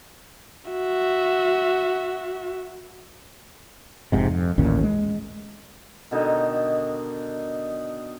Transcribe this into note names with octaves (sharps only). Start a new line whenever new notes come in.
F#4 E5
F1 G#2 C3
F2
A1 D#2 A#2 C#4
G#3
B2 D3 D#3 D#4